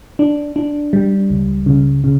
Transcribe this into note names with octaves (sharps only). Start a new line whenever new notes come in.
D4
D4
G3
C#2
C#3
C#3